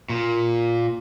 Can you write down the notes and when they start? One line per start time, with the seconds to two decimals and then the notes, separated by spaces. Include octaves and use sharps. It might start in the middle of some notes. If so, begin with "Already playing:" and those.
0.10 A#2